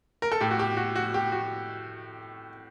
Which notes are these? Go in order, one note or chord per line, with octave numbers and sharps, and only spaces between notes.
A#4
A4
A2 G4
F#4
G4
F#4
F#4
G4
F#4